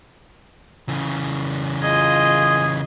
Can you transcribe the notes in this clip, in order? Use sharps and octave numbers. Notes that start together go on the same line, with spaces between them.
C#3 E3
F4 G#4 D#5